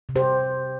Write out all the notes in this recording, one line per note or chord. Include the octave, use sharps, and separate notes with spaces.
C3
G4 C5